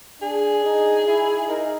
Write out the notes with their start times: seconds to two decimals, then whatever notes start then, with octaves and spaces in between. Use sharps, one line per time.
0.22 D4 G#4
0.65 D#4
1.07 E4
1.49 D#4 A#4